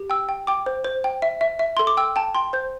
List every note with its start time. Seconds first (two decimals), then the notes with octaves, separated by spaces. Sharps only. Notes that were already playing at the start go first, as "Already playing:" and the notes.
Already playing: G4
0.10 G5 E6
0.29 G5
0.47 G5 D6
0.66 C5
0.84 C5
1.04 G5
1.22 E5
1.41 E5
1.59 E5
1.77 A4 C6
1.87 D6
1.97 G5 E6
2.16 G5 A5
2.35 G5 C6
2.53 C5 G6